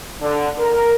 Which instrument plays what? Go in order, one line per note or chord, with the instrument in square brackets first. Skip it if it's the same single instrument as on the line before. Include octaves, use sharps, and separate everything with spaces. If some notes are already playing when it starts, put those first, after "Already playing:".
[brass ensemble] D3
A#4